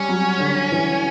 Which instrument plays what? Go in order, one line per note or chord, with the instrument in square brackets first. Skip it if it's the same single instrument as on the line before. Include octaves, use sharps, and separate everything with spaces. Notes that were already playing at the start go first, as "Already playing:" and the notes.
Already playing: [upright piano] G3 [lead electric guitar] C#4
[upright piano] F#3
D3
E3